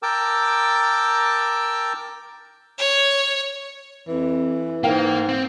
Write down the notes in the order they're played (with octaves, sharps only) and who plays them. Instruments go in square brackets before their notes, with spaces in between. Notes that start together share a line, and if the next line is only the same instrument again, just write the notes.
[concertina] A#4 G5 A5 D6 E6
[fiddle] C#5
[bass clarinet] F2 [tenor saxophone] E3
[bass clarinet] G#2 [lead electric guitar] A#3 [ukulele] A#4 F5 G5
[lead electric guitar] C4